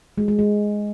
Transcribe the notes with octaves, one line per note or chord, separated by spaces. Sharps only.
G#3
G#3
G#3